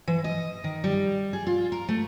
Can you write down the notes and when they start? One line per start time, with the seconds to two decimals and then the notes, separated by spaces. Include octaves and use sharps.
0.08 E3
0.24 D#5
0.64 D#3
0.84 G3
1.33 G#4
1.47 F4
1.72 A#4
1.89 A3